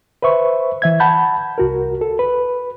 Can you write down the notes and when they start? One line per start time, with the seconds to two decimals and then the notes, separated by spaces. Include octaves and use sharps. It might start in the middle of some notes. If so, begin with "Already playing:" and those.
0.22 B4 C5 E5 C#6
0.82 E3 E5 G#6
1.00 F#5 A5 B5 G6
1.58 C2 F#4 A#4
2.01 A4
2.19 B4